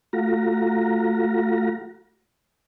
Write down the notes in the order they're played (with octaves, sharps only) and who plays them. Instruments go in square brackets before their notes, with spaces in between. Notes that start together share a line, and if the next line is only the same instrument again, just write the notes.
[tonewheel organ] A3 F4 F#4 A#5